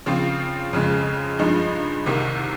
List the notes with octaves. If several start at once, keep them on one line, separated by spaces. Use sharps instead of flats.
C#3 F3 C4 F4
F2 C#3 G#3
G2 F3 G#3 D#4
C2 C3 D#3 A#3